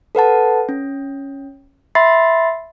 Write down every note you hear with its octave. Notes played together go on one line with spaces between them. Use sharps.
A4 B4 F#5 A5
C#4
E5 B5 C6 A6 C7